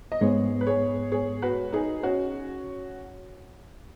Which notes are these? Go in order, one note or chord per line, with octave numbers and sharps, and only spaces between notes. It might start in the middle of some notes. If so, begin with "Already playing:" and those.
D#5
G#2 G#3 B3 G#4 C#5
B4
G#4 C#5
G#4 C#5
F#4 B4
D#4 G#4
C#4 F#4